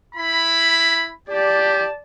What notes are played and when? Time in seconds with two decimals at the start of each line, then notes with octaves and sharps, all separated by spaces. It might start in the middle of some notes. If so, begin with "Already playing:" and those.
0.15 E4 B5
1.29 G4 D5 A5